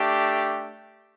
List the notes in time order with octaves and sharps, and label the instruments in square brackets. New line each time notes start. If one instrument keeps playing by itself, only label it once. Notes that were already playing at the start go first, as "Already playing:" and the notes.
Already playing: [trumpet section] A3 D4 G4